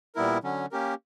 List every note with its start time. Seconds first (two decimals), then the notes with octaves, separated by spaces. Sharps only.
0.15 A#2 G3 B3 E4 A#4
0.43 D3 F#3 C#4
0.72 A#3 C#4 G4 A#4